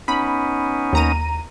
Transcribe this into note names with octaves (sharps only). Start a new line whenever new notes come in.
B3 C#4 D#4 B5
D#2 A#5 D#7